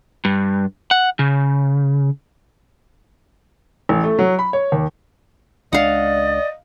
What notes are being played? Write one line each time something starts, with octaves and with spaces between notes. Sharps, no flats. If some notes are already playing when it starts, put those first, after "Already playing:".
G2
F#5
C#3
A1
A3
F#3
B5
C#5
D#2
C#2 G#3 D4 D5 D#5 F5 F#5